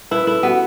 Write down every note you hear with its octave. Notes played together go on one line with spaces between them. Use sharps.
E4 B4
E4 A4
B3 F#4